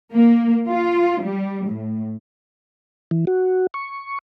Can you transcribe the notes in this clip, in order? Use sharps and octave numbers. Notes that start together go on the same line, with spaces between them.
A#3
F4
G3
A2
E3
F#4
C#6